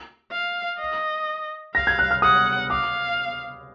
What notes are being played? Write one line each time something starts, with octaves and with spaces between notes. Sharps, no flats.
F5
D#5
F5 A#6
G#6
F#6
F6
F#5 D#6
F5 D6